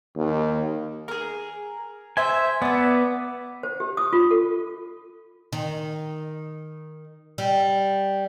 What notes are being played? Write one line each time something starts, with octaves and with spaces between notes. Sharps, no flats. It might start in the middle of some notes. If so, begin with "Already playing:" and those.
D#2
G#4 A#4
C5 E5 G#5
B3 D5 E5
C5
G4
D#6
F4
A4
D#3
G3